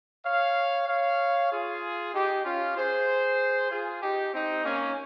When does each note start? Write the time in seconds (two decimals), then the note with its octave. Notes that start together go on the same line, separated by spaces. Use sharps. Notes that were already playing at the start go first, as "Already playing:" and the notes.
0.25 C#5 F5
0.88 C#5 F5
1.51 F4 G#4
2.14 D#4 G4
2.45 C#4 F4
2.77 G#4 C5
3.70 F4 G#4
4.02 D#4 G4
4.34 C4 D#4
4.65 A#3 C#4